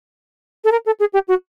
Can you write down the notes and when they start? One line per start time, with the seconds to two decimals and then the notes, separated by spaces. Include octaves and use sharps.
0.64 A4
0.72 A#4
0.86 A4
1.00 G#4
1.13 G4
1.28 F#4